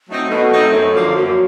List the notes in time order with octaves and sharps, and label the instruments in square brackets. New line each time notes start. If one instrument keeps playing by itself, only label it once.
[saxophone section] F#3 A3 C4 D#4
[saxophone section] B2 [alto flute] A4
[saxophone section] F#3 A3 C4 D#4
F#2
D3 F3 A#3
[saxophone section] F#2 [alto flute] F#4